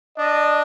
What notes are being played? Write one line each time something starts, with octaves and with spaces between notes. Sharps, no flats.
D4 D#5